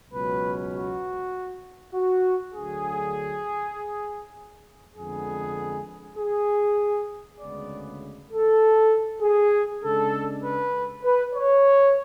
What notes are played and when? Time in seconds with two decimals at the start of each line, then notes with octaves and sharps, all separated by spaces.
0.10 C#2 B2 F#3 C#4 B4
0.72 F#4
1.93 F#4
2.53 D2 D3 F#3 G#4
4.96 F2 D3 G#3 B3 G#4
6.17 G#4
7.39 D2 C#3 G#3 B3 D5
8.30 A4
9.21 G#4
9.82 C#3 G#3 D4 A4
10.43 B4
11.03 B4
11.34 C#5